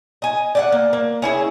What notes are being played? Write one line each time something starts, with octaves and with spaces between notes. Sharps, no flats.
D#5 G#5
D5 E5 F#5
A#3
A#3
C#4 E4 G#4